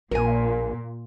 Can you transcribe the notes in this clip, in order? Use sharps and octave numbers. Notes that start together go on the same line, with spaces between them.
A#1 A#2 A#4 G#5